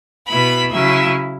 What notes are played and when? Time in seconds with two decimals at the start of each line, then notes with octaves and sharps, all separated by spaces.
0.27 B2 B3 E4 B5
0.72 C#3 F#3 C#4 E4 E5